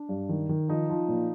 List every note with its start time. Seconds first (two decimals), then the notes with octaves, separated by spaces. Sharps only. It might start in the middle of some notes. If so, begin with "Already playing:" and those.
Already playing: D4
0.09 G2
0.29 D#3
0.49 D#3
0.68 F3 D#4
0.89 F3
1.09 A#2